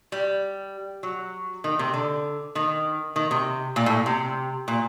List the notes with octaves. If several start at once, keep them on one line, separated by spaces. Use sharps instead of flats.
G3
F#3
D#3
C3
D3
D#3
D#3
C3
A#2
A2
C3
A#2